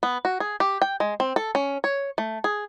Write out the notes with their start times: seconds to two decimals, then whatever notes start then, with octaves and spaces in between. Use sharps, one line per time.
0.03 B3
0.25 F#4
0.40 G#4
0.60 G4
0.82 G5
1.00 G#3
1.20 C4
1.36 A4
1.55 C#4
1.84 C#5
2.18 A3
2.44 G#4